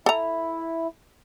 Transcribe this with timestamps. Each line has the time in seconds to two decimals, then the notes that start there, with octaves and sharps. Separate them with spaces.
0.06 E4 A4 A#5